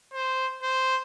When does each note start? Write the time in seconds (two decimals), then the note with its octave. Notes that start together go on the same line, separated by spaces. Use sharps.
0.14 C5
0.63 C5